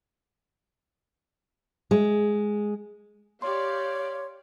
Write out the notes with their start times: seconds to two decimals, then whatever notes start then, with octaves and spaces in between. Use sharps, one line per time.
1.91 G#3
3.42 G4 C#5 D5 F5 C6